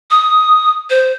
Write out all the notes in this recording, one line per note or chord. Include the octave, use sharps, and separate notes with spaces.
D#6
C5